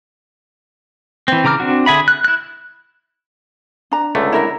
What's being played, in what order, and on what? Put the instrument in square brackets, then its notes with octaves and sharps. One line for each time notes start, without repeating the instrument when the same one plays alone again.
[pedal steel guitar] E3 C4
C#3 E3 A#5 D6 F6
C4 D4 F#4
D3 G#4 E5 B5
F#6
E4 F#6
[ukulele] D4 A#5
[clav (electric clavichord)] C#2 D3 A3
[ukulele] E4 A#4 E5